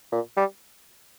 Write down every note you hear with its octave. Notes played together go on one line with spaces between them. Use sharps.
A#2
G3